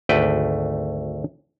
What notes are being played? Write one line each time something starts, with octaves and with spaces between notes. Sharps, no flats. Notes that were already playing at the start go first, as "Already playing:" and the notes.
G#1 D2 A3 B4 G5